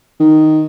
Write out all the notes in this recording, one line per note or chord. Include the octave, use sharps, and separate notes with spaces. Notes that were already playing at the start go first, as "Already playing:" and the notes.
D#3